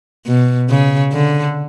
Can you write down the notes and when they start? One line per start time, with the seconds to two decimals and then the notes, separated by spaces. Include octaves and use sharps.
0.26 B2
0.70 C#3
1.13 D3